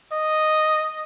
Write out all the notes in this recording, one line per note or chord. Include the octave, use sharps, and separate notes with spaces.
D#5